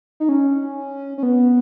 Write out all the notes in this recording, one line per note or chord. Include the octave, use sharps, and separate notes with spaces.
D#4
C#4
C#4
B3